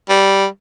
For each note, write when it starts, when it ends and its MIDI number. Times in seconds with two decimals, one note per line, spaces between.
0.09 0.46 55